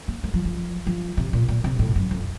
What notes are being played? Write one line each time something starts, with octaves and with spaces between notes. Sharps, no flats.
A#3
A3
F3
F3
F3
C3
A#2
A#2
C3
A2
F#2
F2